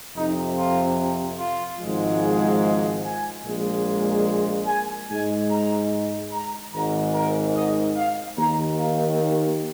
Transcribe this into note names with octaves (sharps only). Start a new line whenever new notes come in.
F2 C3 F3 D#4
F4
F4
G#1 G#2 F3 G#3
G#4
G#5
A#1 A#2 G#3
G#5
G#2 G#3 G#5
A#5
A#5
G#1 G#2 D#3 G#3 A#5
A#4
D#5
F5
D#2 D#3 A#3 A#5
F5